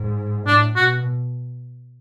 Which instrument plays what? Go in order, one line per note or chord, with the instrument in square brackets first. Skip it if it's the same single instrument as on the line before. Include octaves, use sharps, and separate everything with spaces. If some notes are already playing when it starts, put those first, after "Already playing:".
Already playing: [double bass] G#2
[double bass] A2 [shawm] D4
[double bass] B2 [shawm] F#4